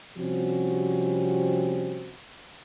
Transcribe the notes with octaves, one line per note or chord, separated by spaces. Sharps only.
C3 F3 G3 C4 C#4 F#4